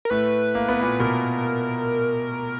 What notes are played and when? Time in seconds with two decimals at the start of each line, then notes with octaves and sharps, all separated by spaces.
0.05 A#4
0.10 A2 A3 B4
0.55 A#3
0.69 B3
0.81 A#2 A#3
1.00 B2 B3 A#4